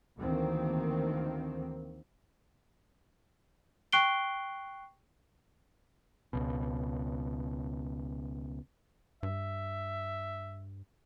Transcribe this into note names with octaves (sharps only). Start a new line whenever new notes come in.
D2 D#3 E3 A#3 C4
G5 C#6 F#6 C7 D7 G7
C#2 B2
G2 E5